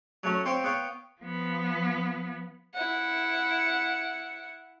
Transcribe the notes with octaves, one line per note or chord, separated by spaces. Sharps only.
F#3 A3 C#4
C4 C5 C#5 F5 G5
B3 C#5 F5 G5
F3 B3
E4 F#5